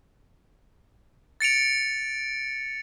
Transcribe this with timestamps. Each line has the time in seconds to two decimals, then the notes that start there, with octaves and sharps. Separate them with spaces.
1.40 A6 C#7 D7 F7